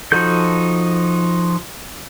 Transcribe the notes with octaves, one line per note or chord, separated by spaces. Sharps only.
F3 D#4 F#4 A4 G6